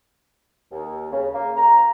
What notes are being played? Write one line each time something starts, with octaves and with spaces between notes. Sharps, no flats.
D#2
C#3
A#3
A#5